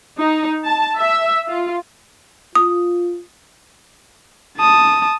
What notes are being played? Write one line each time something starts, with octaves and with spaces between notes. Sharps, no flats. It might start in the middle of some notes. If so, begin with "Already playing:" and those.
D#4
A5
E5
F4
F4 D#6
A5 D#6